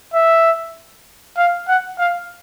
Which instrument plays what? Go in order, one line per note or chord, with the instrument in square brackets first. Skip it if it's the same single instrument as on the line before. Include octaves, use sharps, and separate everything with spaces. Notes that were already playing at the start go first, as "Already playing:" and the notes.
[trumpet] E5
F5
F#5
F5